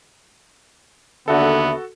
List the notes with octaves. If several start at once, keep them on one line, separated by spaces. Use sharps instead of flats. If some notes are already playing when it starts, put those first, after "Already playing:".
D#2 D3 B3 F#4 A4 E5